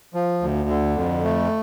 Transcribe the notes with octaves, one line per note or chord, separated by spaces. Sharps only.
F3
D2
D3
F2
A3